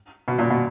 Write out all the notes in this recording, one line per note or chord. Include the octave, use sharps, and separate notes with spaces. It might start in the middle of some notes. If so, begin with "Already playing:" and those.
B2
A#2
B2